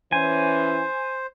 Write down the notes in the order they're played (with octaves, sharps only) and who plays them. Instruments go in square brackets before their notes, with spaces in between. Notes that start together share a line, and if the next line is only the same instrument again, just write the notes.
[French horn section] E3 C#4 [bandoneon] C5 [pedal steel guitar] G#5